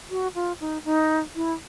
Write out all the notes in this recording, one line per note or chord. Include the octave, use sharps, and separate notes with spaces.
F#4
F4
D#4
D#4
E4